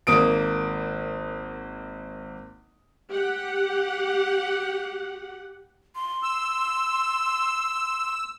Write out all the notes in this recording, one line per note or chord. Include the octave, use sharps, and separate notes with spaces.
G#1 A#3 D#6 D7
G4 F#5
C6
E6